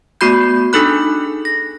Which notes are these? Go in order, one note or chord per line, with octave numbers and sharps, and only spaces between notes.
A3 B3 F#4 B5 G6
D4 D#4 G#4 A4 B5 F#6
A#6